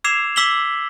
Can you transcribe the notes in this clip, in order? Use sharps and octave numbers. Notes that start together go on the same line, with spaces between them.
D6 E6 G#6 C7 E7 F7
D6 E6 B6 F#7 G7